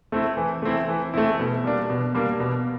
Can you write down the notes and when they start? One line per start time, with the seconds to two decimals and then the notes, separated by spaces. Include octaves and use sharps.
0.12 A3 C4 E4
0.37 E3
0.62 A3 C4 E4
0.88 E3
1.14 A3 C4 E4
1.39 B2
1.64 G3 A#3 D4
1.90 B2
2.15 G3 A#3 D4
2.40 B2